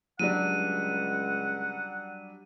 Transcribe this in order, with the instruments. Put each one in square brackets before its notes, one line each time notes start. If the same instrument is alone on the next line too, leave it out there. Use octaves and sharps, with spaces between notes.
[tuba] C#2 [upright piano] F#3 G3 D4 [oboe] F#5 [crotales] D#7